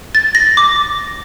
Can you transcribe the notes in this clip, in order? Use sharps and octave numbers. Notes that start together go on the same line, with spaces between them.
A6
A#6
D6